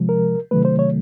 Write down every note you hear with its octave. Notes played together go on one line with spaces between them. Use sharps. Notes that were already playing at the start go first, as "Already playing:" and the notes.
Already playing: C3 F3 G#3
A#4
C3 D#3 F#3 A3 B4
C5
C#5